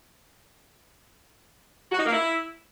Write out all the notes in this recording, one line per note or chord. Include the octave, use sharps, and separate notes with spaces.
F#4
D#4
A#3
E4